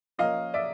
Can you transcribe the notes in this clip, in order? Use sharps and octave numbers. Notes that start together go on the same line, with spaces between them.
F3 A#3 C#4 D#5 F5
D5 E5